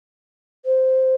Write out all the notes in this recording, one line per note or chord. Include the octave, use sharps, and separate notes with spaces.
C5